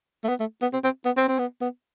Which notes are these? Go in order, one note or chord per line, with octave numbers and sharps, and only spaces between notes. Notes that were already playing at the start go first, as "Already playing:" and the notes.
A3
B3
A3
B3
C4
C4
B3
C4
C4
B3
B3